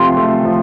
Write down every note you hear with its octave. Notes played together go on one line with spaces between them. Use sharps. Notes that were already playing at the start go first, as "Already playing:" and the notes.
Already playing: C3 F3 A3 F4 C6
A3
F3